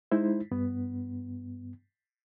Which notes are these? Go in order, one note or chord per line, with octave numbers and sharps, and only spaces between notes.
G#3 D#4 E4 C5
G2 B3